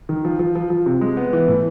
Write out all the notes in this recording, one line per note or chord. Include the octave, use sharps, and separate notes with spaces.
D#3
F3
F3
F3
F3
C3
G#3
B3
E3
A2